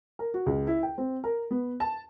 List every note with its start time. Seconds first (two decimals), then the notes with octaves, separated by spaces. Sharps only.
0.19 A#4
0.34 F#4
0.46 C#2
0.67 E4
0.83 G5
0.98 C4
1.24 A#4
1.51 B3
1.80 A5